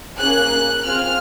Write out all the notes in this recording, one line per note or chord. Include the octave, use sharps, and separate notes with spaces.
A#3 C#4 G#4 F#6
C4 F4 G#4 F6